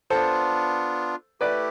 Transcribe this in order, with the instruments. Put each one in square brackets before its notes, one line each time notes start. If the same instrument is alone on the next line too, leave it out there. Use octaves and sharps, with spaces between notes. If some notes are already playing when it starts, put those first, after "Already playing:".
[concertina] B3 D4 F4 [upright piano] A4 C5
[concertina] A3 E4 G4 [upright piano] B4 D5